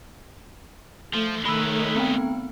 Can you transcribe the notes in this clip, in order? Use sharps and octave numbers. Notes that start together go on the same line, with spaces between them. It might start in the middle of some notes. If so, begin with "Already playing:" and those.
F3 A3
D#3 G#3 A3 B4 C#5 B5 E6
B3 C4 G5